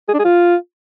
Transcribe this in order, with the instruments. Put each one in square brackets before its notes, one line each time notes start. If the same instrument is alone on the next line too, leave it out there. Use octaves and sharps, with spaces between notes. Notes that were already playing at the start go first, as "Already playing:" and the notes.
[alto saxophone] G#4
D4
G#4
F4